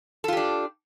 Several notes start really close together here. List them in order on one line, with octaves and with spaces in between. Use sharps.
A4 F4 G4 D4